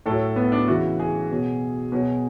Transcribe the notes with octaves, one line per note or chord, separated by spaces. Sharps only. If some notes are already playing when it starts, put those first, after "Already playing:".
A2 F#3 A4
B3
D4
C#3 E3 F#4
G#4
B2 F#3
B2 F#3